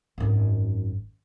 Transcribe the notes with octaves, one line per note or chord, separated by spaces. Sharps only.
G#1 F#2